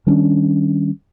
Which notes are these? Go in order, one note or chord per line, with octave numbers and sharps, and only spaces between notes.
D#3 G3 C#4 D4